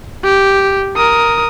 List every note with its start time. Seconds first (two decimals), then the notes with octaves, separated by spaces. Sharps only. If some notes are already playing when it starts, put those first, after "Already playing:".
0.24 G4
0.96 A#4 D#6